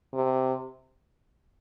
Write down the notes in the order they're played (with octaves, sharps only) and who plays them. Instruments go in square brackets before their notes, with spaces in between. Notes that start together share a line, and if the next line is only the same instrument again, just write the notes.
[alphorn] C3